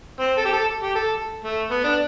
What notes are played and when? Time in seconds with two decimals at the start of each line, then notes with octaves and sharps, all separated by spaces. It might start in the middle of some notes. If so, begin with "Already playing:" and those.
0.20 C4
0.38 A4
0.46 G4
0.53 A4
0.83 G4
0.95 A4
1.45 A3
1.71 B3
1.84 D4